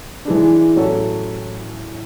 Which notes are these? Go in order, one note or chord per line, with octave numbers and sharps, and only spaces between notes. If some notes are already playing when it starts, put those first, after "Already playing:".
E3 G#3 D4
A2 F#3 C#4 F#4 A4